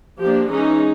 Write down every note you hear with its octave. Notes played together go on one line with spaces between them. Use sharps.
F3 A#3 D4 G4
E3 G#3 C#4 D#4